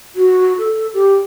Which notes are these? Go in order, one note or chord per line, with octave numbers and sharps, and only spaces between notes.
F#4
A4
G4